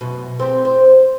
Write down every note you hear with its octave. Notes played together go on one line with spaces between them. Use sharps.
F#2 B2
C4 G4
C5